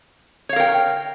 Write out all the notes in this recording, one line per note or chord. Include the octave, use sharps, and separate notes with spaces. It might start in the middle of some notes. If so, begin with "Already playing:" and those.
A#4 C#5 F5 G5